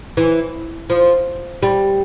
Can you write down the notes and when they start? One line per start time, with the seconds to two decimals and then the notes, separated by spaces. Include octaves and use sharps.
0.17 E3
0.90 F3
1.63 G3